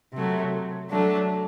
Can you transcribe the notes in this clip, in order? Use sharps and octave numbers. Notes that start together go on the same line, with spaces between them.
C3 F#3 A3
F#3 A3 D4